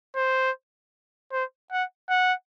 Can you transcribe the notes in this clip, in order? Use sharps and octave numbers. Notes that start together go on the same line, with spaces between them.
C5
C5
F#5
F#5